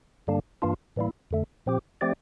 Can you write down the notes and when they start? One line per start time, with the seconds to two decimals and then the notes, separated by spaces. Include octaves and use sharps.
0.27 G2 D3 G3 A#3 D4
0.62 G2 E3 A#3 D4 F4
0.96 A2 E3 G3 A#3 E4
1.31 F2 D3 A3
1.66 A#2 F3 C4 G4
2.01 F3 A3 C4 G4 D5